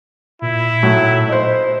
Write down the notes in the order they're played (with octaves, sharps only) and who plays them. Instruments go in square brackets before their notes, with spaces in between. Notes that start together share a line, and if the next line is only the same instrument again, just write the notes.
[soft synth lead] A#2 [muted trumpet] E4
[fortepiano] A2 F#3
C5 D#5